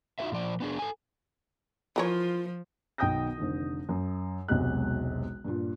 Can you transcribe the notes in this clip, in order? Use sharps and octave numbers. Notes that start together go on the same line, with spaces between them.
D#4 F4 F#4 G#4 B4 E5
A#2 F3 D5
B3 D4 G#4
A4 G#5
E3 F3 F4 A#4 C#5
B1 D#3 G5 D#6 G6 A#6
F1 D3 D#3
F#2
E1 B1 C3 G#3 F#6
G2 A#2